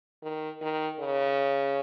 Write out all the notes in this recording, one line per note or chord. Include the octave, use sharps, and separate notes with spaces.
D#3
D#3
C#3